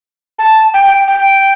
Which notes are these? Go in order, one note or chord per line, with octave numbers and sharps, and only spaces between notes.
A5
G5
G5
G5